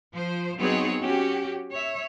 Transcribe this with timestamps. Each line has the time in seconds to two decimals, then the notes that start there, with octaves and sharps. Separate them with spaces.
0.13 F3 C5
0.57 F#3 B3 C4 D#4 G#4 C#5
1.01 C#4 F#4 G4
1.72 C#5 E5